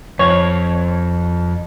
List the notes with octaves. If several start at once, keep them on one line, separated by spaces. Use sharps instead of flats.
F2 C#5